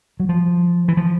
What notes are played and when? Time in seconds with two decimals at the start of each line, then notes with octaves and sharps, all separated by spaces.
0.20 F#3
0.29 F3
0.88 E3
0.97 F3